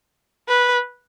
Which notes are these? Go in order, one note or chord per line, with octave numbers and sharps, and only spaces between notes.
B4